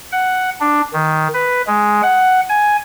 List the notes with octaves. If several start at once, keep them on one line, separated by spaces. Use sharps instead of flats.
F#5
D4
D#3
B4
G#3
F#5
G#5